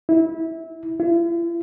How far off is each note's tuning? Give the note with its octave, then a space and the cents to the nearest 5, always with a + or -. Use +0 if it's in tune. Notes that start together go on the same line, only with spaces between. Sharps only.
E4 -20
E4 +45